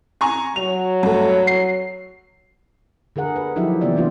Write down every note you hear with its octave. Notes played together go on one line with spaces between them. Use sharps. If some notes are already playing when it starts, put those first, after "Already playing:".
G#5 A#5 C#6
F#3 F7
G2 A3
C7
D3 G#4 A#4 F#5
B4
F3 F#3 D#4 E4 G4 E5
C#3 E3 A#3 B3 G4 D5
C3 E3 B3 D4 F4